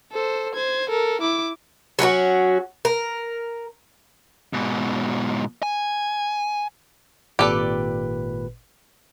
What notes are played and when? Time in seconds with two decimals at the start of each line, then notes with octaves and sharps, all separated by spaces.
0.12 A4 C5
0.55 C5 G#6
0.90 A4 A#4
1.21 E4 D6
1.99 F#3 C#4 D#4 F#4
2.85 A#4
4.53 G#2 B2
5.63 G#5
7.39 G#1 A#2 G4 A4 B4 D5